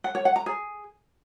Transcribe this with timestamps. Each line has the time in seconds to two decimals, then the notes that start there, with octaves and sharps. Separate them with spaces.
0.04 F#5
0.15 C#5
0.25 F#5
0.36 A#5
0.46 G#4